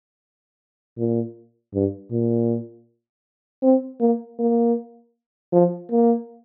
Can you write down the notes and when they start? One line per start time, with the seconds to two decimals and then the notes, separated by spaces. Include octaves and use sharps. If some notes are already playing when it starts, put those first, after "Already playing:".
0.97 A#2
1.74 G2
2.11 A#2
3.63 C4
4.01 A#3
4.39 A#3
5.52 F3
5.91 A#3